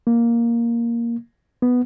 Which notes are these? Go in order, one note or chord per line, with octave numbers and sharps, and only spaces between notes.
A#3
B3